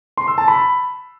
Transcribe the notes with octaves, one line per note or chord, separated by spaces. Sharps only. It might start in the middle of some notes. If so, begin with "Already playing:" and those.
C6
E6
A5
B5